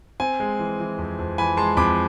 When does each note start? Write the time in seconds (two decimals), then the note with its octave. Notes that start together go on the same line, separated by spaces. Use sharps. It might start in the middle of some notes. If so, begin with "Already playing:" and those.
0.20 C4 G#5
0.40 G#3
0.59 E3
0.80 E3
0.98 F2
1.19 F2
1.38 E3 G#5 B5
1.57 G#3 A5 C6
1.77 F2 B5 D6